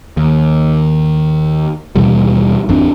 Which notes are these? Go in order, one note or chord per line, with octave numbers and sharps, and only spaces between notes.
D#2
D#2 B2 E3 G3
G#1 F2 C4 D4